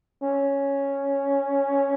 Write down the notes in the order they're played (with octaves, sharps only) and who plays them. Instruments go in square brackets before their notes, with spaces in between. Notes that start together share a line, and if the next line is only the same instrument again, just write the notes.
[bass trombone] C#4